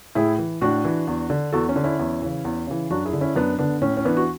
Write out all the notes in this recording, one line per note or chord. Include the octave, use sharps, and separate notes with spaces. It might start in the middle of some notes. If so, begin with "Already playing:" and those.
A2 E4 G#4
E3
A2 D4 F#4
E3
E2
D3
E2 F#4 A4
C#4
D3
C#4 E4
E2
C#3 E3
E2
C#3 E3
F#2 D4 F#4
E4 G#4
D3
C#4 E4
F#2 B3 D4
D3 B3 D4
A2 C#4
C#4
E3 B3 D4
F#4